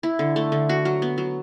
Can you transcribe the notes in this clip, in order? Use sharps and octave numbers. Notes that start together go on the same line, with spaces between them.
E4
D3
A3
D3
F#4
F#3
B3
F#3